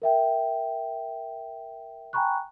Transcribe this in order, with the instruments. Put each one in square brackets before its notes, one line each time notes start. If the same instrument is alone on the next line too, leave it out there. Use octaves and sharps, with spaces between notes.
[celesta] A#4 E5 G5
G5 G#5 A#5 B5 C#6 F#6